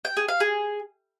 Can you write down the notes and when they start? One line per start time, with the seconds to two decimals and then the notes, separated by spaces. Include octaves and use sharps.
0.05 G5
0.17 G#4
0.28 F5
0.40 G#4